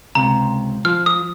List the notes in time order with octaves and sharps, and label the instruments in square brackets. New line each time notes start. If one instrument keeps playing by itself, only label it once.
[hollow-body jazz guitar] C#2 C3 [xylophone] A#5
[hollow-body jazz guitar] F3 [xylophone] F6
[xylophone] D#6